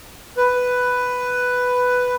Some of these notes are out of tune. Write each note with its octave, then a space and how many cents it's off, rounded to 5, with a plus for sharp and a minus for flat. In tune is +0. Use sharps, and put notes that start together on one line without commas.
B4 +5